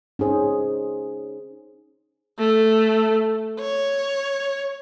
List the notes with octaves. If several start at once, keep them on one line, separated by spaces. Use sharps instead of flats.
C#4 D#4 G#4 C5
A3
C#5